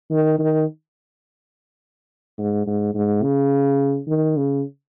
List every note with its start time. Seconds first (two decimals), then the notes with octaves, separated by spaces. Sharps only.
0.11 D#3
0.39 D#3
2.38 G#2
2.66 G#2
2.95 G#2
3.23 C#3
4.08 D#3
4.37 C#3